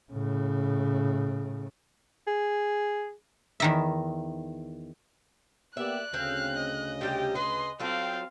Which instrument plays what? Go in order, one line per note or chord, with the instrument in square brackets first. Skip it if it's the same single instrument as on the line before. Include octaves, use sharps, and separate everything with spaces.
[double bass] A2 C#3
[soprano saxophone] G#4
[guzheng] E2 D#3 E5
[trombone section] A#3 B3 G4 [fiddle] D5 [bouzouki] E5 [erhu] F#6
[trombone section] D2 C#3 [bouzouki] C4 [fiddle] F5
[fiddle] D#5
[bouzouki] C3 G3 G4 [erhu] G5
[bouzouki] G#4 B4 [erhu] C6
[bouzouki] F#3 F4 A4 [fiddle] C4 F5 [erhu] G5